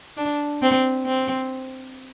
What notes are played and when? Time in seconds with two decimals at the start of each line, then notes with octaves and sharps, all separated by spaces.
0.17 D4
0.62 C4
1.06 C4